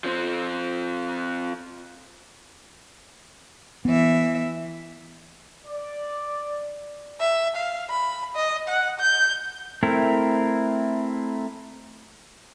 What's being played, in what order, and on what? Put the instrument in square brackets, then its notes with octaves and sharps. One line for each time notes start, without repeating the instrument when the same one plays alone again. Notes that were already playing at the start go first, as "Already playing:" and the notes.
[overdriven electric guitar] F3 C4
[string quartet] E3 E5 [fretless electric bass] B3
[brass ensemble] D5
[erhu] E5
F5
B5
D#5
F#5
G6
[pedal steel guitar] A3 C4 E4 A#4